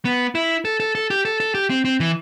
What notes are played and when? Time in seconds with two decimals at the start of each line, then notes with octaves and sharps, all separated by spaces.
0.05 B3
0.35 E4
0.65 A4
0.80 A4
0.95 A4
1.10 G4
1.25 A4
1.40 A4
1.55 G4
1.70 C4
1.85 C4
2.00 E3